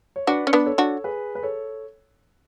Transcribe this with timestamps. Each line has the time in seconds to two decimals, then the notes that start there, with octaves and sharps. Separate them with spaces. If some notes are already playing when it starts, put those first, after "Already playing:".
0.16 C#5
0.27 D4 F#4 B4 D5
0.47 C#4
0.53 B3 D4
0.66 A4 C#5
0.78 D4 F#4
1.04 G#4 B4
1.35 B4
1.43 A4 C#5